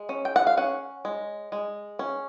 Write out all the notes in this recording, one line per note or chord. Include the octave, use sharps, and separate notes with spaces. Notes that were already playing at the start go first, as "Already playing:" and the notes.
Already playing: G#3
C#4
G5
F#5
F5
C#4 F#5
G#3
G#3
C#4